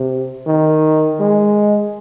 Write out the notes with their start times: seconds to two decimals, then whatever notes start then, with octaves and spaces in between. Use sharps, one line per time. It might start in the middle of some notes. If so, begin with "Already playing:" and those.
Already playing: C3
0.46 D#3
1.20 G#3